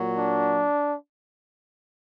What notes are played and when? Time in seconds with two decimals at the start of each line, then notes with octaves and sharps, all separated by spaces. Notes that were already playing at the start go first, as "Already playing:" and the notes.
Already playing: A#2 F#3
0.16 D4